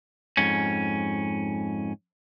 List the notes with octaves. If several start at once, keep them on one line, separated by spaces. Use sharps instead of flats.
F2 G#2 C#4